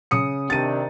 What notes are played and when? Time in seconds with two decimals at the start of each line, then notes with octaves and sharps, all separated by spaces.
0.11 C#3 D#6 C#7
0.50 C3 D#3 D4 A6 D#7